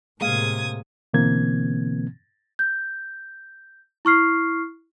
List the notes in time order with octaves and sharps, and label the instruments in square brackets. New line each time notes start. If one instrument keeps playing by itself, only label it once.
[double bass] A2 C3 [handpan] G#3 A#3 F5 [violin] D#6 G#6
[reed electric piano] B2 D3 E3 A#3 C4 G#6
[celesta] G6
E4 C#6 F6 C7